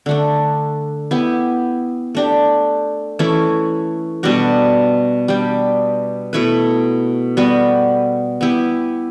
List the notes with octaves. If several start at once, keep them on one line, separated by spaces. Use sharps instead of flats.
D3 A3 D4
B3 E4 G4
A3 D4 G4
E3 A3 C#4 E4
B2 G3 D4 F#4
G3 D4 G4
B2 A3 E4 B4
G3 B3 F#4 B4
B3 E4 G4